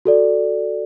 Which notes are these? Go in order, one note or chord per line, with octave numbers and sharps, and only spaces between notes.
F#4 A4 D5